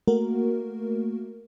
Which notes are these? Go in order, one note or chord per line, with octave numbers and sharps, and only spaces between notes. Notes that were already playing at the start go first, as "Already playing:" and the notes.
A3 A#3 F#4 A#4